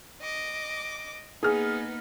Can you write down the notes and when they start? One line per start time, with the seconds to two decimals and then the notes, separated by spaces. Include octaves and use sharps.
0.22 D#5 D6
1.43 A#3 B3 D#4 G#4 F6